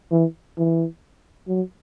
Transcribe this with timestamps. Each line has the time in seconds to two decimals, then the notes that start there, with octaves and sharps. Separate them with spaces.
0.12 E3
0.58 E3
1.48 F#3